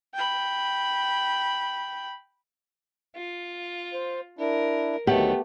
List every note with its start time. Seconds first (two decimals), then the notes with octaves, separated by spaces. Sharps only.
0.14 G5 B5
3.15 F4
3.93 C5
4.39 D4 E4 A#4
5.07 D2 D#3 F#3 A3 B3 G4 F#5